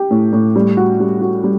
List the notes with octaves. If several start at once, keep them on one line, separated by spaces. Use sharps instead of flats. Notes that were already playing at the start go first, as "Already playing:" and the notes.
Already playing: G4
A2
A2
G3
F#4
G3
F#4
G3